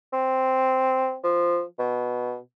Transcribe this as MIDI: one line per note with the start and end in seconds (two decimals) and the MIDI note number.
0.13 1.17 60
1.24 1.63 53
1.79 2.38 47